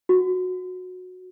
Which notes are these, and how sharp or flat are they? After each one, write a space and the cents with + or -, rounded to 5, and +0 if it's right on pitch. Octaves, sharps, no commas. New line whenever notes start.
F#4 -15